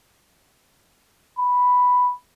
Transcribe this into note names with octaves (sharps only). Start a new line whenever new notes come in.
B5